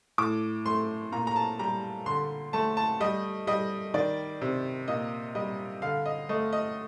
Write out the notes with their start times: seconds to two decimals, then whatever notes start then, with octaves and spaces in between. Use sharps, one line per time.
0.18 A2 D6
0.66 A3 C6
1.12 A#2 A#5
1.27 A#5
1.36 A5
1.59 G3 A#5
2.06 D3 C6
2.53 A3 A5
2.77 A5
3.00 G3 D#5
3.47 G3 D#5
3.94 D#3 D5
4.41 C3
4.88 A#2 D#5
5.35 G3 D#5
5.82 D3 F5
6.06 D#5
6.29 A3 D#5
6.53 D#5